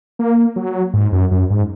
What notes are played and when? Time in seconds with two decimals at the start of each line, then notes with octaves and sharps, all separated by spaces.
0.19 A#3
0.56 F#3
0.94 G#2
1.12 F#2
1.31 F#2
1.50 G#2